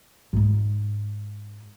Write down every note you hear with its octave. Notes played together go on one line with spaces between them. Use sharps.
G#2 D#4